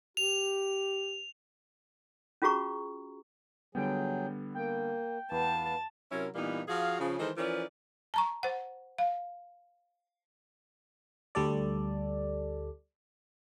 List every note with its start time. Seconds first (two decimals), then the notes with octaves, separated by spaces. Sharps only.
0.17 G4 F7
2.42 C#4 F4 F#4 G#4 A#5 C#6
3.75 D3 F#3 G3 B3 G#4 G5
4.55 A#3 G5
5.31 E2 B3 B4 F5 A5
6.11 C3 F#3 C#4 E4 A#4
6.35 A#2 E3 G3 A#3 B3 D#4
6.68 F3 F#4 G#4 F5
7.00 C#3 F3
7.19 D#3 E3 G#3 A4 A#4 C5
7.37 E3 F3 C#4 A#4 B4 D5
8.14 A5 A#5 C#6
8.43 C5 F#5
8.98 F5
11.35 D2 G3 A4 D5